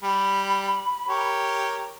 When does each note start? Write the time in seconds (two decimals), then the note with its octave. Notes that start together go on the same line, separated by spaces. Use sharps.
0.03 G3 B5
1.08 G4 A#4 C#5